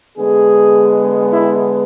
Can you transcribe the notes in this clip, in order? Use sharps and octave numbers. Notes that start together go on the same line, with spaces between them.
D3 G#3 B3 G#4
E4